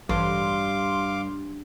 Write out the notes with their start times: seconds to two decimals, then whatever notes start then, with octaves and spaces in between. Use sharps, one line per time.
0.09 A1 G2 F5 C6 D6